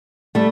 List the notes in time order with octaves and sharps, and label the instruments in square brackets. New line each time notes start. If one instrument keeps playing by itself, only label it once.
[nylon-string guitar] G3 A3